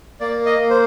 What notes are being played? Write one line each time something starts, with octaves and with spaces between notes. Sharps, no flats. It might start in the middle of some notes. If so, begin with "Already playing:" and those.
A#3 D5
D#5
A#3
C5